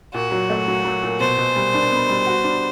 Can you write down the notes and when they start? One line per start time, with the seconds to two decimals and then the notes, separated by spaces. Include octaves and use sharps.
0.14 A#2 F#4
0.32 F#3
0.50 A3
0.68 F#3
0.84 F#3
1.03 A#2
1.20 B2 C5
1.38 B2
1.56 G3
1.74 D4
1.92 B3
2.10 G3
2.27 F#4
2.44 D4